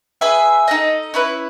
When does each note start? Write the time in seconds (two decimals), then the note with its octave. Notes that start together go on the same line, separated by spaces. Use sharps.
0.21 G#4 B4 E5 G#5
0.68 D#4 A4 D#5
1.14 C#4 E4 B4